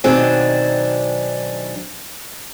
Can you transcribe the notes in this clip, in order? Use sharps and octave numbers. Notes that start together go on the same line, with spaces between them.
B2 D#3 F#3 C4 D4 G#4